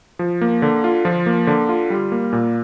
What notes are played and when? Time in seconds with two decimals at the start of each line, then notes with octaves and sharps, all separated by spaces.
0.19 F3
0.41 A#3
0.62 D3
0.84 F4
1.05 F3
1.26 A#3
1.47 D3
1.69 F4
1.90 G3
2.12 A#3
2.33 A#2